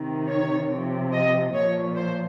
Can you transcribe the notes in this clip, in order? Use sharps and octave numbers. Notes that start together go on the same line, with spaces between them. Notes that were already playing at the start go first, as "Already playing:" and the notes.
Already playing: C3 D#3
C#5
C3 F3
D#5
A#2 F3 C#5
C5